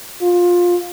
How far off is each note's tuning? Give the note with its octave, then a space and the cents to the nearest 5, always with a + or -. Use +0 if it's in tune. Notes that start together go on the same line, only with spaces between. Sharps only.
F4 +15